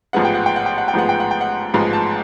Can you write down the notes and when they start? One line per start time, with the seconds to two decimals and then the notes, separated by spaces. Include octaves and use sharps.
0.13 A1 G#2 F3 G#3 B3 F#5
0.25 G5
0.35 F#5
0.46 G5
0.56 F#5
0.66 G5
0.78 F#5
0.88 G5
0.94 A1 G#2 F3 G#3 B3 F#5
1.09 G5
1.20 F#5
1.31 G5
1.41 F#5
1.74 A1 G#2 F3 G#3 B3
1.93 A5